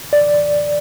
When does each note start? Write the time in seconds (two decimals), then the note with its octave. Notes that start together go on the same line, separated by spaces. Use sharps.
0.13 D5